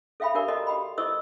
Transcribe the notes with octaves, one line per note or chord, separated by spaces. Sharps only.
A4 E5 F5 G5 B5
D4 G4 A#4 D5
F#4 A4 D#5 A#5
F#4 G4 G5 B5
E4 A4 C5 D#5 C#6 E6